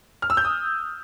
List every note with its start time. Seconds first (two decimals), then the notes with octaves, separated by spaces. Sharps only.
0.22 F6
0.30 E6
0.37 G6
0.45 D#6